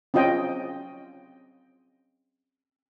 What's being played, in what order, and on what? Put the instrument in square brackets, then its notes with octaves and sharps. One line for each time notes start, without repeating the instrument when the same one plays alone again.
[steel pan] C4 C#4 F4 D#5 G5